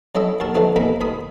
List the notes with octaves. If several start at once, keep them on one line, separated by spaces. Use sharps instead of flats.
F#3 C#4 E4 A4 D#5 E5
D#2 F#4 A#4 A5
D3 E3 F3 A3 D4 D#4
A1 E3 A#3 D#4 A#5 B5
D2 D#3 B5 D#6